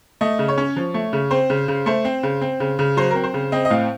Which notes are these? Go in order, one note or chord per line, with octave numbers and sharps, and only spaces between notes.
A3 D#5
C#3
C#5
C#4
F3
A3
C#3
C4 C5
C#3
C#3
A3 C5
C4
C#3
C4
C#3
C#3
F#3 C5
C4 A#4
C5
C#3
C4 D#5
D#5
A2 F5